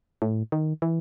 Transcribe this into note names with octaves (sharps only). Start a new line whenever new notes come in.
A2
D#3
E3